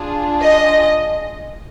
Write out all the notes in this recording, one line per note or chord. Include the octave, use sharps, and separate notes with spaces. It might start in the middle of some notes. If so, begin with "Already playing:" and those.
Already playing: D4 F4 G#4
D#5